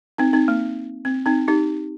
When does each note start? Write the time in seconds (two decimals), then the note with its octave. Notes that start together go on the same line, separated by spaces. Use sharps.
0.18 C4 D#4
0.33 C4 D#4
0.48 A#3
1.05 C4
1.26 C4 D#4
1.48 D#4 G4